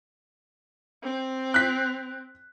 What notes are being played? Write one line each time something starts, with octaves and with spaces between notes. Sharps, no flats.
C4
F#6 B6